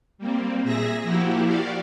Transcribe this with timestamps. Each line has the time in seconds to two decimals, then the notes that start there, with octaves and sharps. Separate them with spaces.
0.18 G3 A#3 C4
0.63 A#2 G#4 E5 A#6
1.03 F3 A#3 E4 F#4 G4
1.45 F#4 G4 D5 F5